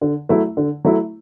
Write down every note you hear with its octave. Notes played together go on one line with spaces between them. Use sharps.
D3
F#3 A3 E4
D3
F#3 A3 E4